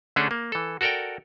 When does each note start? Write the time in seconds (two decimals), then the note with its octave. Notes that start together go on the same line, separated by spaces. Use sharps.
0.16 D3 A3 C#4 D4 G#4 A4
0.31 A#3
0.52 E3 A4
0.81 F#4 A4 A#4 D5 G5